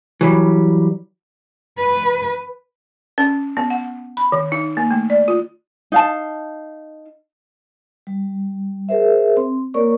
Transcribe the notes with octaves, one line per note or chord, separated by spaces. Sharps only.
E3 F#3 G3
B4
C#4
B3
F#5
B5
D#3
D#4
A#3
A3
D5
F4
D#4 F5 A5
G3
G#4 A#4 C5 E5
C4
A#3 A#4 C#5 D5 C#6